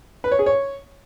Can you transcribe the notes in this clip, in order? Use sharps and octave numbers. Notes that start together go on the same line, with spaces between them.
B4
C#5
G#4
C#5